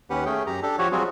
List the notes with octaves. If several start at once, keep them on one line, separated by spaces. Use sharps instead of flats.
D#2 C#4 G4 B4 F#5
A3 C#4 G#4 G5
F#2 G4 A#5
D4 G4 A4
F3 F#4 G4 C#5
F#3 G3 C4 F4 F#4 G#4